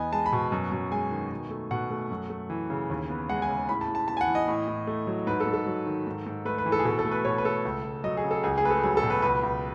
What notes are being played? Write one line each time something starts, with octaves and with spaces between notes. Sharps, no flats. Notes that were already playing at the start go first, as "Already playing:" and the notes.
Already playing: E2 B3 D#5 G#5
G#3 A5
B5
B2
F#2
F#2
G#3 G#5
D#3
B2
A3
B2 F#5
A3
F#2
A3
E3
C#3
D#2
B3
G#3 F#5
G#5
C#3
A2 B5
A5
A2
A5
B3 A5
G#5
F#5
E3
D#5
A2
A2
A3
F#3
G#2 B4
A4
G#2
A4
F#3
D#3
G#2
G#2
A3 B4
B4
E3
A4
G#4
B2 A4
A4
A3
B4
B2 C#5
B4
A3 A4
C#2
C#2
F#3 D#5
G#4
C#3
A4
C#2 G#4
G#4
A3 B4
A4
F#3 G#4
A4
B2
B4
C#2 B4
C#2